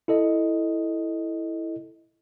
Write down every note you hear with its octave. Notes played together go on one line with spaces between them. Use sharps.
E4 A4 D#5